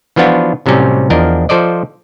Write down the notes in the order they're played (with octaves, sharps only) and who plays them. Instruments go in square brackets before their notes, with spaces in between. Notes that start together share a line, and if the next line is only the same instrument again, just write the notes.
[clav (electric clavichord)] E3 F3 B3 D4 F4 F#4
A2 C3 F#3 G3 C#4
E2 F3 D4 A#4 D#5
F3 A4 C5 D5 D#5